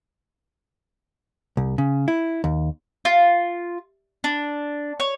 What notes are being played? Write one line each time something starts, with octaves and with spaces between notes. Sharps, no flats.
C2
C#3
E4
D#2
F4
D4
C#5